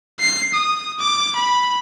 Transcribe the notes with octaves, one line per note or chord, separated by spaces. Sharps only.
C7
D#6
D6
B5